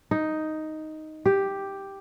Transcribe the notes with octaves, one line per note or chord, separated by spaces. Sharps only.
D#4
G4